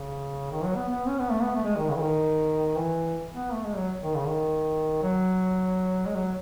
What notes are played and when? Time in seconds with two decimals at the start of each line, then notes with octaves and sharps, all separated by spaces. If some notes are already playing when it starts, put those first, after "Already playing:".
Already playing: C#3
0.51 D#3
0.64 F#3
0.76 B3
0.88 B3
1.08 C#4
1.19 B3
1.31 A3
1.42 B3
1.56 A3
1.64 G#3
1.77 D#3
1.90 C#3
1.96 E3
2.01 D#3
2.77 E3
3.33 B3
3.53 A3
3.65 G#3
3.77 F#3
4.03 D#3
4.15 C#3
4.27 D#3
5.03 F#3
6.06 G#3
6.16 F#3